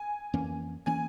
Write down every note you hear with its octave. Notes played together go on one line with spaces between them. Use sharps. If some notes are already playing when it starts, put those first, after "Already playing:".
Already playing: G#5
F2 E3 A#3 C#4
E3 A#3 C#4 G#5